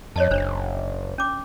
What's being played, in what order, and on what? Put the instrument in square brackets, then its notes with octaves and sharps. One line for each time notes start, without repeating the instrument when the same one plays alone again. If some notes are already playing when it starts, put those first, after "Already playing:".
[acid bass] F2 [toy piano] C#5 D#5 A5
[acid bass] F#1 [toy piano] D4 C5
[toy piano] C#4 D6